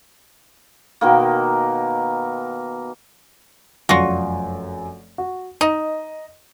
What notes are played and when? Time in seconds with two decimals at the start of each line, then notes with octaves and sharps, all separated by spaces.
1.01 B2 D#3 A#3
3.89 F1 F#2 F4 F#4 D5
5.18 F#4
5.61 D#4 D#5